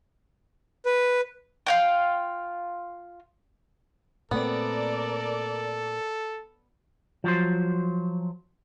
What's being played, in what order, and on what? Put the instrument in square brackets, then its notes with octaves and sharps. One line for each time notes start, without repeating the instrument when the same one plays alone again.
[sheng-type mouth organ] B4
[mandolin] F4 F5 G5
[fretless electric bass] A#2 A3 C4 [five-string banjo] B3 [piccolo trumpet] A4 [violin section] A#4 D5
[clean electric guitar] F3 F#3 C5